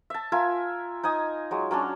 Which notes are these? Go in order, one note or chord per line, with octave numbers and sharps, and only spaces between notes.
E5 A5
F4 A#4 E5 G#5
D#4 D#5 G#5 D#6
F#3 G#3
F#3 C#4 D4 A5